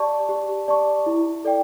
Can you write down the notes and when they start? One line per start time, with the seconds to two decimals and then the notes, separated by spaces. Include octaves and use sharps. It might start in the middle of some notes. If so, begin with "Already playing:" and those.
Already playing: G4 D5 A5 C#6
0.29 G4
0.68 D5 A5 C#6
1.06 E4
1.44 A4 D5 G5